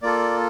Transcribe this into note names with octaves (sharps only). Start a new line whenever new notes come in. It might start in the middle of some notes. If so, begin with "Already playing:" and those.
A#3 F4 A4 D5